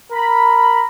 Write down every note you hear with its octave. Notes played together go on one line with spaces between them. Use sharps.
A#4 B5